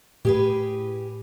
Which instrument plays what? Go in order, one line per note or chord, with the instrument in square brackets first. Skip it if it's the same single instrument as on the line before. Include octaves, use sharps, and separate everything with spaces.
[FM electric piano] A2 [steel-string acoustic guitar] G4 G#4 B4